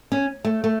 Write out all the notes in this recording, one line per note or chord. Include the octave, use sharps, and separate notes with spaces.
C#4
A3
A3